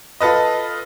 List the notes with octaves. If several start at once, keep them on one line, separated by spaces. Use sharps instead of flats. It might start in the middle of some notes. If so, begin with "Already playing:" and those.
F4 A4 B4 D#5